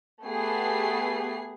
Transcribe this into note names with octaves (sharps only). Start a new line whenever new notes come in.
A3 B3 G4 G#4 C7